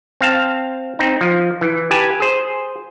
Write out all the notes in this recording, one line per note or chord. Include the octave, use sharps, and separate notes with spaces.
C4 F5 A5
C4 D#4
F3
E3
G4 B4 G#5 A5
G#4 C5